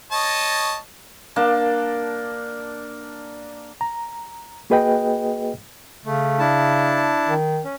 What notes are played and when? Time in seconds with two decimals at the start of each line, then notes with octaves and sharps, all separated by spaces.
0.12 C#5 D#5 A5
1.36 A#3 D4 A5
3.81 A#5
4.70 A#3 F#4 G#4 B4 D#5 G5
6.05 C#3 A3
6.39 D4 E4 A5
7.25 D#3
7.64 C#4